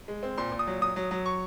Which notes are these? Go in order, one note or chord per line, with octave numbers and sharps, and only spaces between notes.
G#3
C4
A#2 C6
A#2
D#6
F#3
F#3 D#6
F#3
F#3
C#6